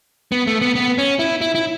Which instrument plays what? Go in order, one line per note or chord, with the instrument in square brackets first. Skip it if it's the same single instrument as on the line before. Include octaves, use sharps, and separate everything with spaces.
[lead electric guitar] B3
A3
B3
B3
C#4
E4
E4
E4